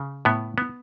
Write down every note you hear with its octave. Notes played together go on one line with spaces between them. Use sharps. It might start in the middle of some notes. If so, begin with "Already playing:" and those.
Already playing: C#3
A2 B3
B3